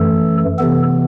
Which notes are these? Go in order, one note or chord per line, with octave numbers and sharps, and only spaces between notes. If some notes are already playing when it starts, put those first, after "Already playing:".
Already playing: F#2 E3 A3 A4
C3 E3 B3 A4